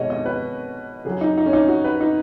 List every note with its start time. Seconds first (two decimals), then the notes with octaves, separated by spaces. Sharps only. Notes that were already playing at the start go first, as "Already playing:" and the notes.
Already playing: B2 G#3 C#5 D#5
0.10 D#5
0.26 B4
1.05 C#3 F#3 G#4
1.21 D#4
1.38 D#4
1.46 C#4
1.53 D#4
1.68 F#4
1.84 B4
2.01 D#4